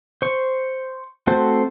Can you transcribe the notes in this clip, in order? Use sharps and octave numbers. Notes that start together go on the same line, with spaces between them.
C5 C#6
A3 C4 F#4 A4 C5